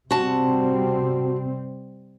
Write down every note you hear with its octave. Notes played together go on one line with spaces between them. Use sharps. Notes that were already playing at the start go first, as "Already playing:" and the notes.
C3 G3 C4 F#4 A5